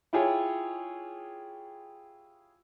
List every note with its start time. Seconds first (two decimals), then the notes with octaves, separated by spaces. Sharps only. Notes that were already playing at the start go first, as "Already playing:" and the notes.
0.13 E4 F4 G4 G#4 C#5